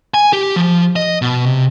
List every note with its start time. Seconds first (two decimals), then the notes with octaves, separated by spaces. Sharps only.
0.14 G#5
0.33 G4
0.56 F3
0.96 D#5
1.22 B2
1.46 C3